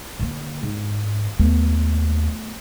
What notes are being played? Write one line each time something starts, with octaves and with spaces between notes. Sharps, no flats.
D3 A#3
G#2
D#2 A3 B3